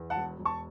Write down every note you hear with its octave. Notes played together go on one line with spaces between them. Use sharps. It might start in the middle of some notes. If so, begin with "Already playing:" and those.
Already playing: E2
F#5 A5
E1
E1
A5 C#6